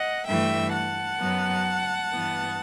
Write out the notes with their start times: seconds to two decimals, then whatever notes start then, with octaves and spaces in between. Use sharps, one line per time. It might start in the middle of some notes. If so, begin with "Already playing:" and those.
Already playing: D#5 F#5
0.26 G2 E3 A3 E5 G5
0.73 F#5 A5
1.19 F#2 F#3 B3
2.13 G2 E3 B3